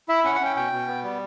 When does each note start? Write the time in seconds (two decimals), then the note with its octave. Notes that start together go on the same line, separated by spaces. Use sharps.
0.09 E4 E5
0.24 C#4 F#5
0.35 F#5
0.41 C#4 G5
0.56 B2 G5
0.72 B2
0.87 B3
1.03 G3